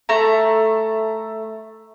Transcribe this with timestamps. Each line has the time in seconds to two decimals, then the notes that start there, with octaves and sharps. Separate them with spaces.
0.09 A3 A#5